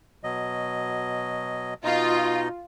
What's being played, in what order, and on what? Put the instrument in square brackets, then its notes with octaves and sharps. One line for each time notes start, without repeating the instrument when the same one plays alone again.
[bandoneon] B2 F#3 D#5
[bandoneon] B2 D#4 D#5 [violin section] F4